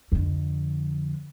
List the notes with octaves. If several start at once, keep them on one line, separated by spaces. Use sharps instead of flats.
F2 D3